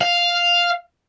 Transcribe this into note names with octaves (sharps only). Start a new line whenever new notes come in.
F5